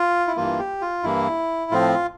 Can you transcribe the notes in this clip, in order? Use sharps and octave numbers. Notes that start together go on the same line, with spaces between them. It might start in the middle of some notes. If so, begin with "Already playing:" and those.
Already playing: F4
E4
G2 E3 A#3 F4
G4
F4
G2 E3 A#3 E4
A2 F3 C4 F4